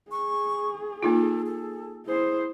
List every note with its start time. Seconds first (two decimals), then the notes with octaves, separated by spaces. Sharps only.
0.11 G#4 C#6
1.03 A#3 D#4 F4 A4
1.46 A4
2.06 E4 G#4 C5